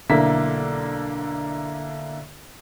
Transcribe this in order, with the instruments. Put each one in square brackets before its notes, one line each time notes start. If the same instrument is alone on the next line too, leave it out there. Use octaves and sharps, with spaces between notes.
[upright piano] B1 D3 A#3 E4 B6